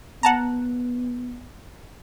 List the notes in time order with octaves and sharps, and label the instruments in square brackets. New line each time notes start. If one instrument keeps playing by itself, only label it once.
[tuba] B3 [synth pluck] F#5 A5 A#5